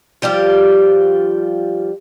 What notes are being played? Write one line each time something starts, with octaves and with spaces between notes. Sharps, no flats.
F3 G3 F4 G4